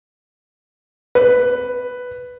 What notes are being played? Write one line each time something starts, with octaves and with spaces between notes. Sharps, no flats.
B4